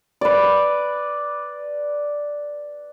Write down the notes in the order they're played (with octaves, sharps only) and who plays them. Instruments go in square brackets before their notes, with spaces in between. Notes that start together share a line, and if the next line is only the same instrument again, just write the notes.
[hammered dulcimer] B4 D5